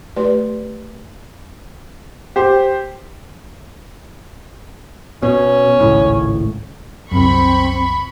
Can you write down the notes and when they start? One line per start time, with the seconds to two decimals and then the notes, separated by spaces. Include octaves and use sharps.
0.16 A3 G4 B4 D5 C6
2.36 G4 C5
5.23 B2 C#4
5.80 G#1 C#2 A2
7.11 C2 F#2 C4 B5 C#6